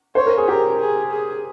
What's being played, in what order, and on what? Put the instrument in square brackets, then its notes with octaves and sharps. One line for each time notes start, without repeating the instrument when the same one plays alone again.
[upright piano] C5 [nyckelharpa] C#5
[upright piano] A#4
G#4
[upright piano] G4 [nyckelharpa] A#4
[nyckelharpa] G#4
G#4